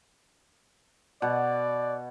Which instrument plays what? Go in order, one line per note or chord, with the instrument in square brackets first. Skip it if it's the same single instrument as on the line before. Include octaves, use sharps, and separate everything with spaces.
[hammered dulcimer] B2 F#5 [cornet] D5